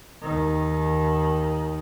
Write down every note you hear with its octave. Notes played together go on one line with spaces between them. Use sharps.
D#2 D#3